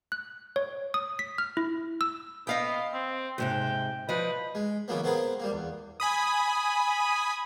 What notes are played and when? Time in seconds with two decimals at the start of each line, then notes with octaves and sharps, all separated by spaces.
0.12 F#6
0.56 C#5
0.94 D#6
1.19 B6
1.38 F6
1.57 E4
2.01 E6
2.47 B3 D#5 F5 G5
2.94 C4
3.38 D#2 G#2 C3 G5
4.09 F3 B4 D#5
4.55 G#3
4.88 C#3 E3 F#3 A#3 B3
5.03 B3 C4 G#4 A#4 B4
5.40 G3 A#3
5.52 E2
6.00 G#5 B5 D#6